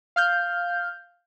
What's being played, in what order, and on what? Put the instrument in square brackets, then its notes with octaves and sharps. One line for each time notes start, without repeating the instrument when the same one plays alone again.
[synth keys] F5 F6 G6